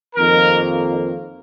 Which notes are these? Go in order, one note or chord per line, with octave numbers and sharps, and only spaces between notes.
F2 D#3 A#3 A#4